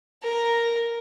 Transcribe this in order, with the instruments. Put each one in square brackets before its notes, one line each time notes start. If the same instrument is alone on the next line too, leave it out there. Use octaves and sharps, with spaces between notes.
[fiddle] A#4